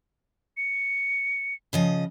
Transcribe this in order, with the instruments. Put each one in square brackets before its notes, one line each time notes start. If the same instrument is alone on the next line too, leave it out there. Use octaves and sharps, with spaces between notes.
[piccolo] C#7
[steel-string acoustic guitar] C#3 F3 D#5